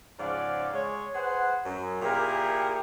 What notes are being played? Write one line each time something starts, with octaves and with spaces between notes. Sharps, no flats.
G#2 C#3 F3 D5 F5 F#5
G#3 C#5
G#4 B4 C5 F#5
F#2
A#2 E4 G4 G#4 A#4